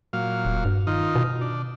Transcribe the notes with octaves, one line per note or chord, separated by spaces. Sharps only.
A#2 F#3 F5
D#1
G2
D#3 D#4 F4
B2
D4